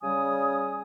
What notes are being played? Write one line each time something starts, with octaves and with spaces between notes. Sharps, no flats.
C#3 G3 G#5 D#6